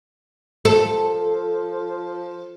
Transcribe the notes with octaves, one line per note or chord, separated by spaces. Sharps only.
F3 A4